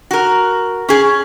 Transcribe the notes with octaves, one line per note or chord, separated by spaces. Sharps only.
F#4 A#4
C#4 G#4